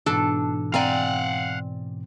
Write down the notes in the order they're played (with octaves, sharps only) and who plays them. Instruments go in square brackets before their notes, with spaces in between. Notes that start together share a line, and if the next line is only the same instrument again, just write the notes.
[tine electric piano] G#2 B2 E3 [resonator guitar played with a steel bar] D4 [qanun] A4
[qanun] C4 [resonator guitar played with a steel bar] D5 G#5 A#5 [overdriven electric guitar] F5 F#5